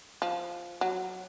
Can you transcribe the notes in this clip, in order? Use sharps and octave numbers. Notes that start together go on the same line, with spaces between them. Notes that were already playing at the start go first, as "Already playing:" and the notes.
F3
F#3